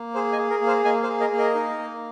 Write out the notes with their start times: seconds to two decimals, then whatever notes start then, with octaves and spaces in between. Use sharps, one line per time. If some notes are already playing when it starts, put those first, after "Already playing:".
Already playing: A#3
0.14 G#4 C5
0.32 D#5 G#5
0.38 G#4
0.50 A#4
0.61 A#3
0.67 C5 F5
0.85 A#3 D#5 G#5
1.03 C5 F5
1.08 G#4
1.20 A#4 D#5
1.32 A#3
1.38 A#4 D#5
1.55 D#4
1.79 A#3